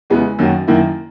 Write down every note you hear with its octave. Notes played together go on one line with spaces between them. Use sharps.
E2 C#3 E3 G#3 B3
F#2 D#3 A#3 C#4 F#4
F#2 D#3 A#3 E4